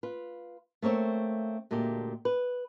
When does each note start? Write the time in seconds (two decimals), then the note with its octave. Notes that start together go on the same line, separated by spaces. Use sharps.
0.03 F4 B4
0.82 A3 A#3 C4 C#5 E5
1.71 D2 A#2 G#3 A3 G4
2.25 B4